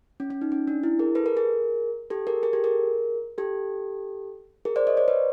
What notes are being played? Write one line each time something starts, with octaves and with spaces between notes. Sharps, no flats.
C#4
C#4
D#4
C#4
D4
E4
G#4 A#4
A4 B4
G#4 A#4
G#4 A#4
G4 A4
G#4 A#4
G#4 A#4
G4 A4
G#4 A#4
G4 A4
G#4 A#4
C5 D5
C#5 D#5
C5 D5
B4 C#5